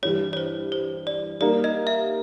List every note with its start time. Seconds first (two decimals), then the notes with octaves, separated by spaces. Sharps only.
0.03 G2 E3 G3 C#5
0.33 C#5
0.37 C5
0.72 C5
1.07 D5
1.40 G3 A#3 D#4 D5
1.64 D#5
1.87 E5